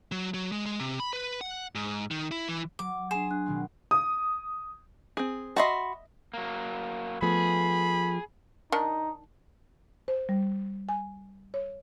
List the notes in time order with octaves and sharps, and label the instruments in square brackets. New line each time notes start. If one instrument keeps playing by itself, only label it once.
[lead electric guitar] F#3
F#3
G#3
G#3
C3
B5
B4
F#5
G#2
D#3
E4
E3
[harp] F#3 [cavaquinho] D6
[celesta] D4 E7 [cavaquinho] G#4 C6
[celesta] D4 F#6
[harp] B2 D#3 C4
[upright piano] D#6
[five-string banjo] C4 G#4
[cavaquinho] F#4 B5 C6 [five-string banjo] D#5 E5 A5
[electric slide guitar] F#3 A#3
[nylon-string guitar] F3 A3 B3 [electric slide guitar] G#4 [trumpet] B5
[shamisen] D#3 D4 [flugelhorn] D#4
[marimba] C5
G3
G#5
C#5